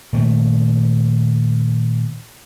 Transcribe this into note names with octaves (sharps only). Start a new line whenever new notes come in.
A#2 D#3 A3